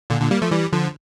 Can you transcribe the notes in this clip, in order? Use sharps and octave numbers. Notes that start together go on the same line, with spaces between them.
A#2 D3
A#2 D3
G3 A#3
F3 A3
E3 G3
D3 F3